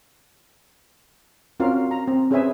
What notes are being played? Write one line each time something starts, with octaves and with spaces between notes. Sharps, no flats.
C4 C#4 F4 F#4 A#4 F5
A#5
C4
C#4 G#4 B4 C5 E5 G#5